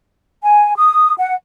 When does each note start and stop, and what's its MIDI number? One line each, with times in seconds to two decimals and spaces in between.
0.43 0.73 80
0.76 1.13 87
1.17 1.34 78